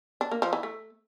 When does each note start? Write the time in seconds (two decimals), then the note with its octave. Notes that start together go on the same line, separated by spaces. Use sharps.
0.21 D4
0.31 A#3
0.42 F3
0.53 E3
0.63 A3